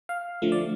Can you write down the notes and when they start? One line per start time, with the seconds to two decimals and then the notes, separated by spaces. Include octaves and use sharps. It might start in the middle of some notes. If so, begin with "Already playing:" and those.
0.09 F5
0.42 D3 F3 A3
0.52 D5